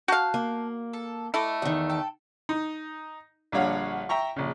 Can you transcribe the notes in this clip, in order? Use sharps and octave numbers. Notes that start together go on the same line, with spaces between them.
F#4 F5 A5 F#6 G6
A#3
A4
A3 E4 A4 D#5 D6
E2 D#3
A4 G5
D#4
A#1 D3 G3 C#5 F5 F#5
E5 G5 A#5 C#6
A#1 C#3